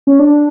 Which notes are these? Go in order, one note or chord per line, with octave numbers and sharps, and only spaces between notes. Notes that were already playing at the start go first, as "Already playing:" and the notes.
C#4
D4